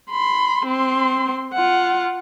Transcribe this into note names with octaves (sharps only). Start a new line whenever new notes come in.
B5 C6
C4 C6
F4 F#5